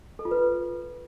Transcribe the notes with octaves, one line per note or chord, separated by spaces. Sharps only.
A4
F4
B4